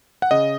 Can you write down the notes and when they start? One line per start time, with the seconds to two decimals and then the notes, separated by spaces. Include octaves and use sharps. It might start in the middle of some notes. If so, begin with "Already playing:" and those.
0.22 F#5
0.31 C#3 D#5